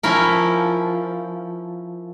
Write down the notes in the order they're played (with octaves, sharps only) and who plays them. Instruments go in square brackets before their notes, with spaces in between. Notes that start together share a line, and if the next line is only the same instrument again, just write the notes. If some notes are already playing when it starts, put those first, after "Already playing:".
[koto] F3 C#4 E4 A#4